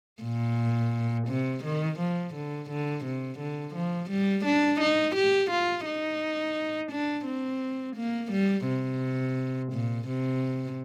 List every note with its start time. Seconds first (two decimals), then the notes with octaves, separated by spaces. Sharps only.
0.23 A#2
1.28 C3
1.64 D#3
1.99 F3
2.34 D3
2.69 D3
3.05 C3
3.39 D3
3.75 F3
4.10 G3
4.45 D4
4.81 D#4
5.16 G4
5.51 F4
5.86 D#4
6.91 D4
7.26 C4
7.96 A#3
8.32 G3
8.67 C3
9.73 A#2
10.08 C3